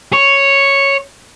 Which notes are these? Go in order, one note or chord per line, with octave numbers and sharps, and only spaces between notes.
C#5